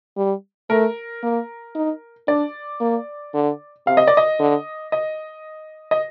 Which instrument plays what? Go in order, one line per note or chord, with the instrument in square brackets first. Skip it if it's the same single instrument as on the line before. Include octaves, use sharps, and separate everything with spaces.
[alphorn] G3
[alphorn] A3 [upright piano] A#4
[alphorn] A#3
D#4
[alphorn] D4 [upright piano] D5
[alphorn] A#3
D3
[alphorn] C3 [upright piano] F5
[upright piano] D#5
D5
D#5
[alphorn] D3
[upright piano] D#5
D#5